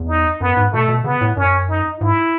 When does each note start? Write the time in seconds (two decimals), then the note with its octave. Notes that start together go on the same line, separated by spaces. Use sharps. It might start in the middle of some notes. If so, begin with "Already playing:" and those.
Already playing: E2
0.08 D#4
0.41 F#2 B3
0.57 G#2
0.73 B2 A3
0.88 B2
1.04 C#3 B3
1.21 A2
1.37 F#2 C#4
1.69 D#4
2.00 G#2 E4